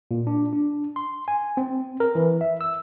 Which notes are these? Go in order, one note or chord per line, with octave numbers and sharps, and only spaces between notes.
A#2
D4
D4
C6
G#5
C4
A#4
E3
E5
E6